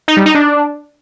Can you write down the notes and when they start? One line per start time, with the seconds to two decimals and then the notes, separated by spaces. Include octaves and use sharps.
0.08 D#4
0.17 G3
0.26 D#4
0.35 D4